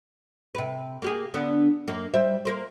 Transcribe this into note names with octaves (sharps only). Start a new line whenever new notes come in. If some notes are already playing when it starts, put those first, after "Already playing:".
C3 B4
A#3 G4 G#4
D3 B3 D4
F#2 A#3
G3 C5 E5
A#3 A#4 C5